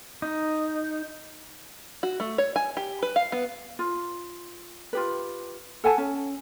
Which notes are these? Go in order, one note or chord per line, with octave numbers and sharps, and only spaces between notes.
D#4
F#4
A3
C#5
G#5
G4
B4
F5
B3
F4
F4 G4 B4
A4 F#5 G#5 A5
C#4